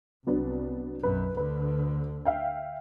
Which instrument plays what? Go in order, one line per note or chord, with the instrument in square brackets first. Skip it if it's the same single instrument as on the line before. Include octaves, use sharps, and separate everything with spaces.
[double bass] C2 [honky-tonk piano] F#3 B3 D4
[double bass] B1 F#2 [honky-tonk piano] B4
[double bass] D2 D3 [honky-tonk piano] B4
[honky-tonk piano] E5 F5 G5